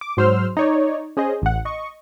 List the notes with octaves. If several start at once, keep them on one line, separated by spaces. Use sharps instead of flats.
D6
G#2 F#3 C5 C6 E6 F6
D#4 C#5 D5
C#4 G#4 C5 D#5
A1 F#5
D#5 C#6